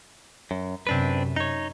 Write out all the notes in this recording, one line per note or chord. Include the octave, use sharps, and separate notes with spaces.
F#2
F#2 C3 C4 D4 B4
D#4 C#5